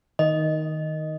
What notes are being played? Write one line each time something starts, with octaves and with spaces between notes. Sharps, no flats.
D#3 D#5